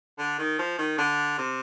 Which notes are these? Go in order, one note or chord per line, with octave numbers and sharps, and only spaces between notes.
D3
D#3
F3
D#3
D3
C3